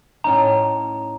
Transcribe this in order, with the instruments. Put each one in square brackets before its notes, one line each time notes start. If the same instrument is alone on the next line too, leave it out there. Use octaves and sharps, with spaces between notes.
[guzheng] A2 C#4 D#4 [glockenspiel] A#5